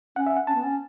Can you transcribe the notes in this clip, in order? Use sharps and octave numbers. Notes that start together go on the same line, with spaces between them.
C#4 F#5
E5
F#5
C#4 A5
B3
C#4